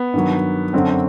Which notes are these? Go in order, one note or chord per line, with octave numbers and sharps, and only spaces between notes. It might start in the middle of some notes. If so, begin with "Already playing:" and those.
Already playing: B3
G2 D#3 F#3
F#2 D3 F#3 C4